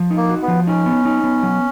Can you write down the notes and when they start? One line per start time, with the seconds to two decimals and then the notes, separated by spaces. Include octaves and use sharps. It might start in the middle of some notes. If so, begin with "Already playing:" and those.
Already playing: F3
0.11 D#4
0.17 A#3
0.29 F#4
0.42 B3
0.48 F3
0.67 C#4 D#4
0.86 B3
1.05 D#4
1.24 B3
1.43 F#3